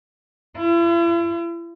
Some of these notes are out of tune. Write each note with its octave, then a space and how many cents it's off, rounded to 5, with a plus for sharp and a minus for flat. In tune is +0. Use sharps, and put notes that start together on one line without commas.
E4 +45